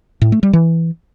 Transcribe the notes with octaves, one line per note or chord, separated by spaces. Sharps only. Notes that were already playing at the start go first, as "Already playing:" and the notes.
A2
A3
G3
E3